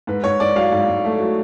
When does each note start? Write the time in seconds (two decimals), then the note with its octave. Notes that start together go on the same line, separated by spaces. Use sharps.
0.07 G#2 B4
0.23 G#2 C#5
0.40 G#2 D5
0.56 F#3 F5
0.72 G#2
0.89 G#2
1.05 A3
1.20 F#3